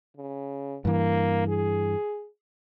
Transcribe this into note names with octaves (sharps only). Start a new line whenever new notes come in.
C#3
G2 E3 A#3
G#4